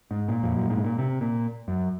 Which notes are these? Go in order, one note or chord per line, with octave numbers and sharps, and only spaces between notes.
G#2
A#2
F2
F#2
G#2
A#2
C3
A#2
F#2